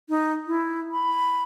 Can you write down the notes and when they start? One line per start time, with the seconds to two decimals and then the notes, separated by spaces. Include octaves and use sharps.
0.09 D#4
0.47 E4
0.92 B5